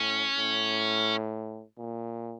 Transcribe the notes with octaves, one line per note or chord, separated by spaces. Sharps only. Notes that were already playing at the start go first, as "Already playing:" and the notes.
Already playing: A2 C#4
A2
A#2